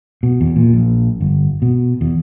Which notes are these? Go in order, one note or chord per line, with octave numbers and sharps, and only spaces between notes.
B2
E2
A#2
A#1
G1
B2
E2